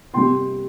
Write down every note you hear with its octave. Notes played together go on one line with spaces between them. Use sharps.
C3 G3 G5 C6